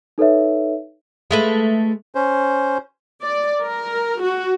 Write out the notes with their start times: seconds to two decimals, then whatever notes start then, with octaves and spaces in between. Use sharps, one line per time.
0.18 D#4 A4 B4 C#5 E5
1.31 G#3 A3 B4
2.15 C#4 C5
3.23 D5
3.61 A#4
4.20 F#4